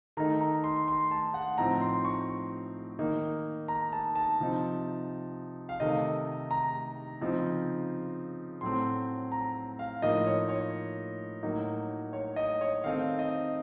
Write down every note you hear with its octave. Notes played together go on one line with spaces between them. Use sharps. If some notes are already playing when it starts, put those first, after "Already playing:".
D#3 A3 D#4 A#5
A#5
C6
C6
A5
F#5
A2 F3 C4 D#4 A#5
C6
C#6
D#3 A#3 D#4
A#5
A5
A5
C3 F3 C4 D#4
F5
C3 D#3 A3 D#4 D#5
A#5
C#3 F3 C4 D#4
A2 F#3 A3 C4 C6
A#5
F5
A2 F3 A#3 D#4 D#5
C#5
C#5
A2 F#3 A#3 D#4
C#5
D#5
C#5
D#3 A3 C4 D#4 F5
D#5